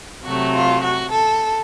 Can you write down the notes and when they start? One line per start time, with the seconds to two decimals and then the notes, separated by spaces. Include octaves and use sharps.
0.23 C3 F#3 A3 F#4
0.53 F4
0.82 F#4
1.11 A4